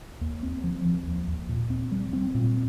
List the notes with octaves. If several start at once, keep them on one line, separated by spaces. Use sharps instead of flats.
D#2
C4
F3
F3
D#2
D#2
A#2
C4
G3
C4
A#2